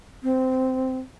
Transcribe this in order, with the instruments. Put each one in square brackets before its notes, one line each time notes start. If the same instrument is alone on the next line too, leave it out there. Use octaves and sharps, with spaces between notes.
[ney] C4